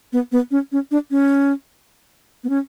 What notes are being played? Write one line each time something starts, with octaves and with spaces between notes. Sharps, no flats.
B3
B3
C#4
C#4
D4
C#4
B3
C#4